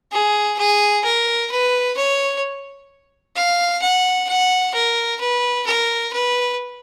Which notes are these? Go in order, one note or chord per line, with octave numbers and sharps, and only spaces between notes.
G#4
G#4
A#4
B4
C#5
F5
F#5
F#5
A#4
B4
A#4
B4